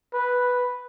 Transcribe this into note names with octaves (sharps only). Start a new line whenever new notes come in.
B4